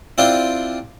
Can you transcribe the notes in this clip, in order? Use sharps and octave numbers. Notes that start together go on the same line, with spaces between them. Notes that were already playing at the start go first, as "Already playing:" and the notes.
C4 D4 E4 F4 G4